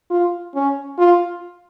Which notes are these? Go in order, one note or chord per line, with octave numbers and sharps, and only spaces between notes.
F4
C#4
F4